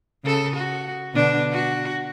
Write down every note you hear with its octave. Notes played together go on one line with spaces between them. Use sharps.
C#3 A4
F#4
B2 D3 D4
F#4